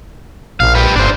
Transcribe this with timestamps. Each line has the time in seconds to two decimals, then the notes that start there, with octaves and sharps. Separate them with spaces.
0.60 A#1 F5
0.75 G4 B4
0.96 G1 D4 C5